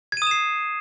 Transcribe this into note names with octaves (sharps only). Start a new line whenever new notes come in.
D#6 G#6 C7 D#7 E7